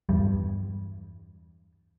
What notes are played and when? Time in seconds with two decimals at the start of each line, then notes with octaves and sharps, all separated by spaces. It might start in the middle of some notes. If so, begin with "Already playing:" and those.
0.09 E2 G2 G3